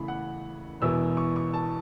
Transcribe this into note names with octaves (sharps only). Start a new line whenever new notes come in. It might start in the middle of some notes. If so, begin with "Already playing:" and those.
Already playing: E2 C#3 A3 E4 B5
F#5
E1 E2 B2 B3 E4 E6
C#6
C#6
A5